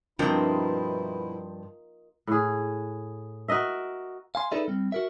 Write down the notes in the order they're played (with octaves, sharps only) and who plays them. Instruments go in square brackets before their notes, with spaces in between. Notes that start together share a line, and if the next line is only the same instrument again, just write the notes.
[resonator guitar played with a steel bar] G2 F3 C4 [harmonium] B2 E4 [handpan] F4 A#4 D#5
[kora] A2 G#4
F#4 A#4 D#5 E5
[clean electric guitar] F5 G#5 C6
D#4 G#4 A4 B4 D5 E5
G3 C4
F#4 A#4 E5